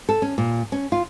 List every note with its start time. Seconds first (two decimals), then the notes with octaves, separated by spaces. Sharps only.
0.09 A4
0.22 C#4
0.38 A#2
0.72 C#4
0.92 F4